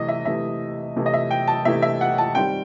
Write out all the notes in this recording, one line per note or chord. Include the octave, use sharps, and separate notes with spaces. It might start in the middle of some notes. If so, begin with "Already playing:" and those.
Already playing: C3 E3 A3 D#5
E5
C3 E3 A3 E4 E5
C3 E3 A3 E4
D#5
E5
G5
A5
C3 E3 A3 E4 E5
E5
F#5
A5
D#3 G3 C4 G5